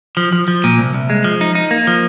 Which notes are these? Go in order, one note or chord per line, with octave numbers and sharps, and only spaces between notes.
F3
F3
F3
A#2
C2
C2
G#3
F3
D#4
D#4
A#3
F3